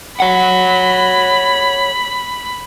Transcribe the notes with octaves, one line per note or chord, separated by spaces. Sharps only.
C#5 F#5 B5